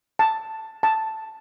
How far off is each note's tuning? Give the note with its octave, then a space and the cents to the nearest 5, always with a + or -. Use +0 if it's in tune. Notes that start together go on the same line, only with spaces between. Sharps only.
A5 +10
A5 +5